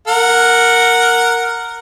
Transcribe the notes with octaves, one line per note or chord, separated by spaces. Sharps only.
A#4 F#5